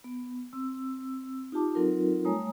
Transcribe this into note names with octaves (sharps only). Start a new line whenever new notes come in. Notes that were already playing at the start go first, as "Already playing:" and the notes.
B3
C4 E6
D#4 F4 G4 A5 D6
F#3 C4 D#4 F4 A4 A#4
G3 A3 C#5 G#5 A#5 D#6